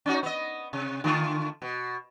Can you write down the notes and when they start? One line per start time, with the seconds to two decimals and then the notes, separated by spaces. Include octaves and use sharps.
0.06 C#4 D#4 F#4
0.23 B3 D#5
0.73 C3
1.04 D3 A3 F4
1.62 B2